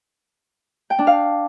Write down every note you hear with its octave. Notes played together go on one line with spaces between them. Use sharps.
G5
D4
F5